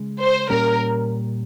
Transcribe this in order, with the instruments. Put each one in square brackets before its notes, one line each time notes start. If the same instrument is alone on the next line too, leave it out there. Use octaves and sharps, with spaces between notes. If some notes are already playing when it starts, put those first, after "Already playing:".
Already playing: [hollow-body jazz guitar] C#3 G#3
[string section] C5
[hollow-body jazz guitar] A#2 G3 C#4 [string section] A#4